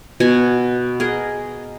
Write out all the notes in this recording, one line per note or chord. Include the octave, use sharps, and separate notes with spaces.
B2 F#4 G#5
G#4 A#4 D#5